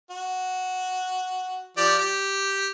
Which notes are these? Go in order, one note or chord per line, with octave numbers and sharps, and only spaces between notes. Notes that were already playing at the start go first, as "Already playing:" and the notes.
F#4
F3 G4 D5
G4